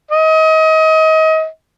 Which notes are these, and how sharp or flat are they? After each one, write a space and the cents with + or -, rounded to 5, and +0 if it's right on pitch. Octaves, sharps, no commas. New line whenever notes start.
D#5 +30